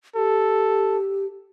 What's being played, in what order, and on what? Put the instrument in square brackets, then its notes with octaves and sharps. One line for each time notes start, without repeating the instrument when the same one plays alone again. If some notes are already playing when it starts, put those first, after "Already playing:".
[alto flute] G4 [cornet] A4